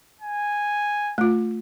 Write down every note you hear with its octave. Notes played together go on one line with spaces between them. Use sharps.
G#5
A3 F4